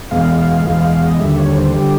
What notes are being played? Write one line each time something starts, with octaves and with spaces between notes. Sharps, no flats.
E2 B2 G#3 F5
F5
E2 B2 G#3 F5
F5
F5
D#5
D#2 D3 G3 E5
C#5
C5
D3 G3 G4